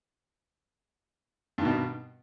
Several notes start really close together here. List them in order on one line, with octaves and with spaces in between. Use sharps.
G2 D#3 B2